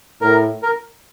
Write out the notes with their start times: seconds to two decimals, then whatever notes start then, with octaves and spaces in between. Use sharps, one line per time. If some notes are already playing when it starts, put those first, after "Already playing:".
0.21 A2 A#4
0.63 A#4